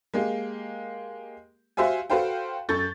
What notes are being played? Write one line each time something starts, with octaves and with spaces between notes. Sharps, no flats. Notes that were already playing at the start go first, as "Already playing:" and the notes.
G#3 A#3 G4
F#4 G4 C5 E5 F5 G#5
F#4 A4 B4 C5 F5 G5
F#2 A4 C#6 G6 A6